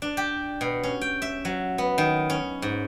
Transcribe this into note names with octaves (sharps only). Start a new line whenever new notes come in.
D4
G4
B2
C#4
G5
E5
F#3
B3
D#3
C#4
G#2